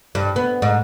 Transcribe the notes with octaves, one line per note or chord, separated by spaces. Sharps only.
G2
B3
G#2